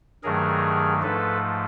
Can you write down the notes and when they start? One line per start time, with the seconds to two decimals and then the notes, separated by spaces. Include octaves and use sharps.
0.23 G2 D#3 F#3 A3 G#4 A#4
1.02 G#2 F3 A3 A4 B4